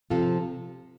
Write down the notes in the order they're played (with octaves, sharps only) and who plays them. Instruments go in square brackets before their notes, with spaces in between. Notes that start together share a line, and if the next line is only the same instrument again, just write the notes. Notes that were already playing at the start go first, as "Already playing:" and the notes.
[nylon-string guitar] C3 F3 C4 F4 A4